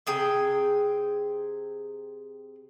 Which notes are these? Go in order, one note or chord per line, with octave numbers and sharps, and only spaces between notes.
C3 G#4 G5